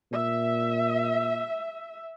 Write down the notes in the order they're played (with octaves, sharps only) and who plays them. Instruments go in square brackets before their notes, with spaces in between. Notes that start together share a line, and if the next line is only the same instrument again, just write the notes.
[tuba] A#2 [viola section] E5